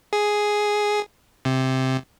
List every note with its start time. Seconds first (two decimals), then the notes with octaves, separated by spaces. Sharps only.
0.13 G#4
1.45 C3